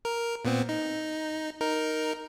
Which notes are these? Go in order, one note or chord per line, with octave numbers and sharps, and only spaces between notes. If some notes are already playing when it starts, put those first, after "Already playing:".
A#4
A#2 B3 C4
D#4
D#4 A#4